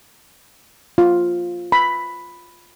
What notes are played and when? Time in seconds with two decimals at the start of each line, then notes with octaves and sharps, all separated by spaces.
0.98 F4
1.72 B5